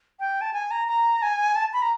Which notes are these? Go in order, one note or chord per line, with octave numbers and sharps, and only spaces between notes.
G5
A5
G#5
A#5
A#5
G#5
A5
B5
A#5